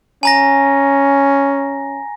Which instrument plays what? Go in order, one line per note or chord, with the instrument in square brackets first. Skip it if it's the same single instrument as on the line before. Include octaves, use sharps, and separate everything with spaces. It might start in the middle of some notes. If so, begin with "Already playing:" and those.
[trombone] C#4 [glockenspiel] G#5 A#5 A#6